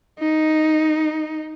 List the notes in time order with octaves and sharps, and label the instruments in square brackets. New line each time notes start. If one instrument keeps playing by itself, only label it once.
[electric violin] D#4